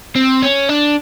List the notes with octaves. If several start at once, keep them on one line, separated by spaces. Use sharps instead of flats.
C4
C#4
D4